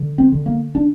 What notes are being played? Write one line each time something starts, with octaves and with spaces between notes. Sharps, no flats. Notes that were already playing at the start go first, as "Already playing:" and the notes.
Already playing: D3
C4
D3
A#3
D4